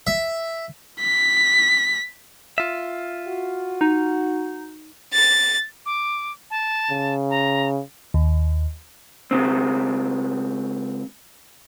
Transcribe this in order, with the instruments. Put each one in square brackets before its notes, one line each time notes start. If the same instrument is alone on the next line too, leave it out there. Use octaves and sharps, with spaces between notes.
[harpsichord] E5
[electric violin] B6
[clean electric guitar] F4 E5
[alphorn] F#4
[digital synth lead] D#4
[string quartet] A6
[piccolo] D6
A5
[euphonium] C#3
[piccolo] A#5
[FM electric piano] D#2
[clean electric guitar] C#2 C#3 C4